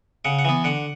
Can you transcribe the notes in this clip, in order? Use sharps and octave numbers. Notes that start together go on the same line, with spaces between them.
C#3 F#5
F#5
E3 B3
D3 F#5